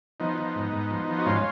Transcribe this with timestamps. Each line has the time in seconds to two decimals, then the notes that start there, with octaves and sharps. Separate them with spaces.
0.20 F3 B3 D#4
0.38 F3
0.55 G#2
0.73 G#2
0.91 F3
1.08 F3
1.18 F#4
1.26 G#2 C#4 F4